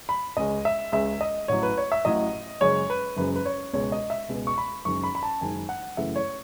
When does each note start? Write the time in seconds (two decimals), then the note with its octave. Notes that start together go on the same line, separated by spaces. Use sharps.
0.09 B5
0.37 C#2 C#3 G#3 C#4 D#5
0.65 E5
0.92 C#2 C#3 G#3 C#4 E5
1.21 D#5
1.48 A1 A2 F#3 C#5
1.63 B4
1.78 C#5
1.92 E5
2.05 A1 A2 F#3 D#5
2.61 F#1 F#2 C#3 G#3 C#5
2.90 B4
3.17 F#1 F#2 C#3 G#3 B4
3.36 B4
3.45 C#5
3.73 C#2 B2 G#3 B3 C#5
3.92 D#5
4.10 E5
4.29 C#2 B2 G#3 B3
4.47 C#6
4.58 B5
4.85 F#1 F#2 D#3 G#3 C#6
5.03 B5
5.15 B5
5.23 A5
5.41 F#1 F#2 D#3 G#3 G#5
5.69 F#5
5.97 F#2 C#3 E3 A3 E5
6.16 C#5